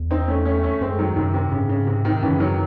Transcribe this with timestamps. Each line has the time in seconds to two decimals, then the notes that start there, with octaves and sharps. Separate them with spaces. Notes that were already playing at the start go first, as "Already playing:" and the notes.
Already playing: E2
0.11 C4 D#4
0.28 A3 C#4
0.45 A3 C#4
0.63 A3 C#4
0.81 F#2 G#3 C4
0.99 D#3 F#3
1.16 F#2 C3 D#3
1.34 C3
1.52 G#2 C#3
1.69 C#3
1.87 C3
2.05 C3 D#3
2.22 F#2 C#3 E3
2.40 D#3 F#3